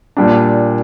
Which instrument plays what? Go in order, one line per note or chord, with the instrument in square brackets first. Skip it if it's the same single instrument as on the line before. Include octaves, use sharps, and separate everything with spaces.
[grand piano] A#2 G3 D4